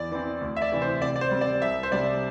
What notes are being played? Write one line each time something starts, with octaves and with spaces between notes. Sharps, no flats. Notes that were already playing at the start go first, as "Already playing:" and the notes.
Already playing: E2 D5
E3 C4
D2
E5
D5
C3 E3
C5
C3 D5
D5
C5
G3 C4
D5
C2 E5
C5
C3 G3 D4 D5